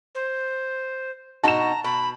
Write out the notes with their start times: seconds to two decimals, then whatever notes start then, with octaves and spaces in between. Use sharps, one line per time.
0.15 C5
1.44 B2 D#4 F#4 A5 A#5 E7
1.84 B2 B5